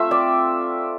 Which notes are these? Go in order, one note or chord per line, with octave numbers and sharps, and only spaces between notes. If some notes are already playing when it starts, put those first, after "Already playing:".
Already playing: A3 C4 F4 E5
D5